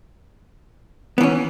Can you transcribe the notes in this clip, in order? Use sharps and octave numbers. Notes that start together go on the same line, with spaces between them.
E3 B3 C#4